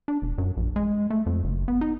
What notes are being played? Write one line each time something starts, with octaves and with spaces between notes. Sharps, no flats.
D4
E1
F#2
A#1
G#3
A3
F2
F#1
B3
D#4